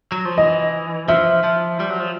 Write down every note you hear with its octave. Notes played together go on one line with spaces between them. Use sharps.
F#3
F3
E3 D#5
F3 E5
F3
G3
F#3
F3